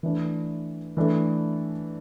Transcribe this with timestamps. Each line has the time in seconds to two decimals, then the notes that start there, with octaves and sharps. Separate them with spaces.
0.03 E3 A3 D4
0.97 E3 A3 D4 A4